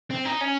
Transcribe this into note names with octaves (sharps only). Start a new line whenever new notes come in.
C4
D#4
C#4